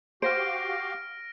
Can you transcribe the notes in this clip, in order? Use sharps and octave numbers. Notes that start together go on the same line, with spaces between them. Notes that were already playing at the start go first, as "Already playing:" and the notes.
F#4 G4 C5 F5 F6 A#6 D7